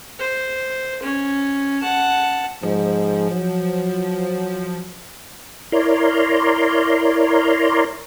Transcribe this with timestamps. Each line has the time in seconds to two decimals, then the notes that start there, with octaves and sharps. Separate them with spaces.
0.19 C5
1.03 C#4
1.82 F#5 A5
2.63 G#2 F3
3.30 F#3
5.72 E4 A#4 C#5 D5 A#5 C6